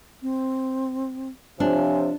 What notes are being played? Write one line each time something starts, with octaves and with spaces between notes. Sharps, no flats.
C4
C3 F3 D4 C#5 G#5